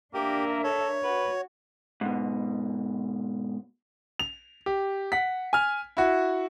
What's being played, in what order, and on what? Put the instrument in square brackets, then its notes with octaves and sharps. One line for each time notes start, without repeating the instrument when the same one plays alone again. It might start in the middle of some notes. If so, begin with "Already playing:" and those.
[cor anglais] A#3 [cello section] D4 A#4 E5 [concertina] G4
[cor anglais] A4 [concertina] C#5
[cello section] F#4 [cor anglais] B4
[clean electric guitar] G#2 B2
[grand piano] F7
G4
F#5 B6
G#5 F6
E4 F#4